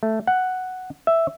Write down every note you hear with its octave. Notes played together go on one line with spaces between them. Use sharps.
A3
F#5
E5